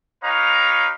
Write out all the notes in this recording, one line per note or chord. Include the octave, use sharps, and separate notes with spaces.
D#4 G4 B4 C#5 F5 A#5